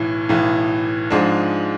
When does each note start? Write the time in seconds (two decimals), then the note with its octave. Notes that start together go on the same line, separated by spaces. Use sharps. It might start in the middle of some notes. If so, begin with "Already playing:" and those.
Already playing: B1 A2 E3
0.29 B1 A2 E3
1.10 G#2 F3 G#3 D4